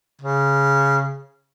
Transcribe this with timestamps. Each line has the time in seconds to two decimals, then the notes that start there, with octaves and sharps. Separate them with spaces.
0.21 C#3